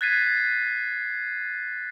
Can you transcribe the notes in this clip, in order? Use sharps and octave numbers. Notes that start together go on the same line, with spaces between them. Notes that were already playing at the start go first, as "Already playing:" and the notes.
F#6 G#6 A6 B6 C7 D#7